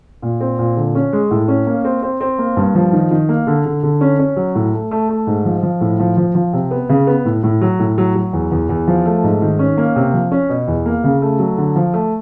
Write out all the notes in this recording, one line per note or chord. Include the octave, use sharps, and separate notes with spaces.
A#2
C4
A#2
D3
C#4
G#3
A2
C#4
A#3
C4
C4
C4
A#3
G2
F3
D#3
D#3
A#3
D3
D3
D3
C#4
C#4
F#3
A2
A3
A3
A3
G#2
F3
F3
A2
F3
F3
F3
C3
B3
C#3
B3
A2
A2
F#3
A2
F#3
F#3
E2
E2
E2
F3
A3
G#2
D#3
C#4
A#3
C3
F3
C#4
B2
E2
A#3
C#3
A3
F#3
D3
F3
A3